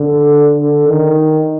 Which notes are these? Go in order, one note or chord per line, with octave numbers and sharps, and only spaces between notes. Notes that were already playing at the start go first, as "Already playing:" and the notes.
Already playing: D3
D3
D#3